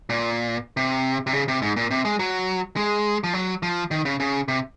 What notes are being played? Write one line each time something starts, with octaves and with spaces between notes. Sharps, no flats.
A#2
C3
C3
C#3
C3
G#2
A#2
C3
G#3
F#3
G#3
F3
F#3
F3
D#3
C#3
C#3
C3